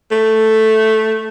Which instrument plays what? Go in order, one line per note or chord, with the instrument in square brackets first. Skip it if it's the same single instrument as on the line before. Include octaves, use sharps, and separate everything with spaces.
[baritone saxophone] A3